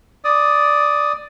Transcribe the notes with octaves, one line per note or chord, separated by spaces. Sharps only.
D5 D#6